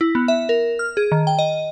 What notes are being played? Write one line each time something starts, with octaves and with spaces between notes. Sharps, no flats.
E4
B3
E5
A#4
F6
G#4
D#3
G5
D#5